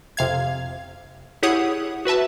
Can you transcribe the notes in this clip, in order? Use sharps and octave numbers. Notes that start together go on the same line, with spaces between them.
F2 C3 F5 G#6
E4 G4 G#4 C#5 F#5 D#6
F#4 B4 E5 A5